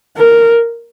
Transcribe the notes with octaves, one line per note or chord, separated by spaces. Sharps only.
A#4